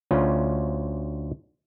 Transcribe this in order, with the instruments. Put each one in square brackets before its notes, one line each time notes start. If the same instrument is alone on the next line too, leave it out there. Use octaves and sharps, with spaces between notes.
[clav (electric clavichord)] D2 C#4 F4